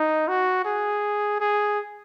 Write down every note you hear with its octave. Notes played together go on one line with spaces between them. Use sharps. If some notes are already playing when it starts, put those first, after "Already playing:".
Already playing: D#4
F#4
G#4
G#4